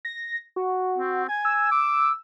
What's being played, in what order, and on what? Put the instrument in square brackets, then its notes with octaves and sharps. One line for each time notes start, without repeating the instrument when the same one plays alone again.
[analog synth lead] A#6
F#4
[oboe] C4
[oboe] G#5 [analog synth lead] G#6
[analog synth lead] E6
[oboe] D6